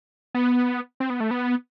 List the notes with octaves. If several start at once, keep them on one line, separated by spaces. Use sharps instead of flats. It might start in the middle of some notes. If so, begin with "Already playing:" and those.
B3
C4
B3
A3
B3